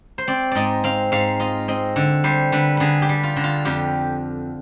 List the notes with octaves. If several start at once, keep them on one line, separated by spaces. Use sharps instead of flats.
C5
C4 D5
G#2 D5 D#5
C4 F5
G#2 F5
F4 D#5
C4 D#5
D3
G3 C5
D3 B4
D3 G#4 B4
G4
G3
F4
D3
F4
F2 G4